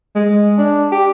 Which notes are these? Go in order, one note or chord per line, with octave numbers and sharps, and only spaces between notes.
G#3
D4
G4